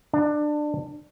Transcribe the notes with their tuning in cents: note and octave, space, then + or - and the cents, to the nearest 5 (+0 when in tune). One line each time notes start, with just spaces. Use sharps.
D4 +20